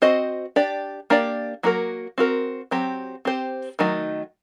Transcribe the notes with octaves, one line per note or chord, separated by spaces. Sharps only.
C4 F#4 C5 D#5
D4 G4 D5
A#3 D4 G4 D5
F#3 A#3 F#4 A#4
C4 F#4 A#4
F#3 C4 G4
C4 G4 C5
D#3 F#3 A3 D#4